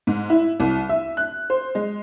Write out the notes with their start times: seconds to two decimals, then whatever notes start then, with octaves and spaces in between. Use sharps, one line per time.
0.07 G#2
0.30 E4
0.60 C2
0.89 E5
1.17 F#6
1.50 C5
1.75 G#3